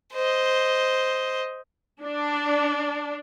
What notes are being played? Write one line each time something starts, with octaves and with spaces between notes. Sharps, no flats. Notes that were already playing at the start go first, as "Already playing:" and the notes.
C5 D#5
D4